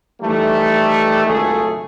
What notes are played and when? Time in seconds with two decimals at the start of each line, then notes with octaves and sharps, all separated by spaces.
0.22 D#3 E3 G3 A3
1.27 G#1 C#2 F#2 C#3 A3 G#4